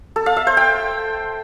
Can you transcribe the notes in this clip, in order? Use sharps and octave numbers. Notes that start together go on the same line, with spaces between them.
A4
F5
E5
C5
G5